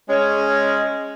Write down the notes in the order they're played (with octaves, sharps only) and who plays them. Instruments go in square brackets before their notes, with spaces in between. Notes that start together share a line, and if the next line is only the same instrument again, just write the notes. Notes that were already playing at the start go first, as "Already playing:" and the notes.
[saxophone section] G#3 C#4